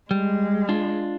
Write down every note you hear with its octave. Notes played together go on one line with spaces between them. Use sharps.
G3 G#3
D4 F4